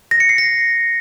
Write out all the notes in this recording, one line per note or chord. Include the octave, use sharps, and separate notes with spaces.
A#6
C#7
C7
A#6